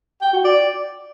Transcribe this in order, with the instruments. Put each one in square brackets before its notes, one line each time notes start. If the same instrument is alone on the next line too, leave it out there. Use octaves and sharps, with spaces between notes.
[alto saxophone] G5
F#4
D5